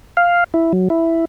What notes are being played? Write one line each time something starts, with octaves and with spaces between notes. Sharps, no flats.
F5
E4
F#3
E4